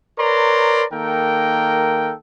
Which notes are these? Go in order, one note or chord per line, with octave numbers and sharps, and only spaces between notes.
A#4 B4 C#5 D5 A#5 C6
D#3 A#3 A4 A#4 G5